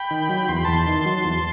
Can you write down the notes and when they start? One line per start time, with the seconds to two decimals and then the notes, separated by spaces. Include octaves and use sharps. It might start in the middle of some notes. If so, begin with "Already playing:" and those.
Already playing: G5 B5
0.11 D#3
0.30 F#3
0.48 E2 C6
0.57 B5
0.65 E2 A5 C6
0.87 D#3
1.06 F#3
1.25 E2